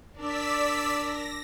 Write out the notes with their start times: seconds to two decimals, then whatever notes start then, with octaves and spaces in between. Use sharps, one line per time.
0.16 D4 A#4 D5 E6 B6
0.98 A#6